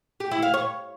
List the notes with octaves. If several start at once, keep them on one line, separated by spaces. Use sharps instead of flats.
G4
E4
F5
C#5